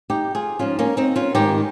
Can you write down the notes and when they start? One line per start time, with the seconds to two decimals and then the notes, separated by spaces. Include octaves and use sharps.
0.10 D#4 G4
0.35 F4 G#4
0.59 G#2 F3 C#4 F4
0.79 A#3 C#4
0.97 C4 D#4
1.16 C#4 F4
1.35 G#2 D#3 G3 D#4 G4